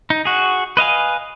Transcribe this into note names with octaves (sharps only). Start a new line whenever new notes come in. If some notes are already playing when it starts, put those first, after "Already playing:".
D#4
F#4 G#4
B4 D#5 F5 G#5